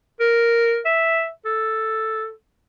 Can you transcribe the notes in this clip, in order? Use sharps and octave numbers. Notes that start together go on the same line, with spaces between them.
A#4
E5
A4